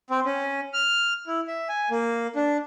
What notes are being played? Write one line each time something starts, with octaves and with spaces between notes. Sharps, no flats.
C4
C#4
F6
E4
E5
G#5
A#3
D4